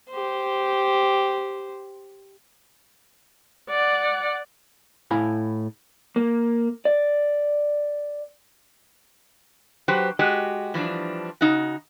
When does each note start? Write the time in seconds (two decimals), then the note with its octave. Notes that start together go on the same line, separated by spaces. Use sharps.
0.10 G4 C5
3.70 D5 F#5
5.11 A2 E4 F5 G#5 B5
6.16 A#3
6.85 D5
9.88 F#3 F#4 G4 B4 C5
10.19 G#3 F#4 G4 D#5
10.74 E3 F3 G3 D4
11.41 C#3 D#4 F#4